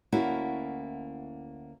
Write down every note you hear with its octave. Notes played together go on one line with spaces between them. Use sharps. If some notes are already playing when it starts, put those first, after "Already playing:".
D2 A#3 C#4 E4 F#4